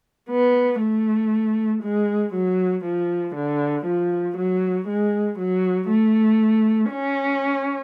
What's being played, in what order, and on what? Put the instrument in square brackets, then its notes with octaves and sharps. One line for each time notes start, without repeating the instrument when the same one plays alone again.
[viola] B3
A3
G#3
F#3
F3
D3
F3
F#3
G#3
F#3
A3
C#4